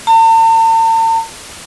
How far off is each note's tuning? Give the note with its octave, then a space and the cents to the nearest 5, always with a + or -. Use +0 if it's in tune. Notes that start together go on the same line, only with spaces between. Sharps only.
A5 +45